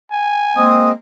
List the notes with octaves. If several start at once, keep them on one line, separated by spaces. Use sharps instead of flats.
G#5
G#3 A#3 C4 D#6